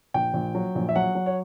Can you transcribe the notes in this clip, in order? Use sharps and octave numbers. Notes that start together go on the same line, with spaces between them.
A#1 G5
A#1
F#3
A#1
E5
F#3 F#5
F#3
C#5